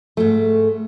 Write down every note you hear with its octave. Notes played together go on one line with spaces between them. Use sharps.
G#2 A3